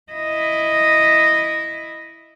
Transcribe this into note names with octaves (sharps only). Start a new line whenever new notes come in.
E4 D#5